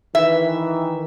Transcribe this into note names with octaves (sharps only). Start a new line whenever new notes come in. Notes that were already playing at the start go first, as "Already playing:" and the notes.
D#3 E3 E5